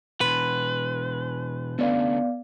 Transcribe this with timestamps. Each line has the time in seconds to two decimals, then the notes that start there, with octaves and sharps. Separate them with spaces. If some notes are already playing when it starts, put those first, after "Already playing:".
0.21 B2 E3 B4 C6
1.79 D3 A3 B3 C#4 D5 F5